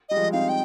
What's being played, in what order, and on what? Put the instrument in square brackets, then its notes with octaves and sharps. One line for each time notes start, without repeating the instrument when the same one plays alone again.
[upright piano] G3 [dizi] D#5
[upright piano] F3 G#3
[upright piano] C4 D#4 [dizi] F5
[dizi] G5